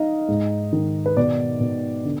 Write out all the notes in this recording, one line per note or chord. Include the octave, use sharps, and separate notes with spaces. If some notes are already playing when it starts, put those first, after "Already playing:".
Already playing: D#4 D#5 F5
G#2
D#3
B4
B2 D5
B2
D3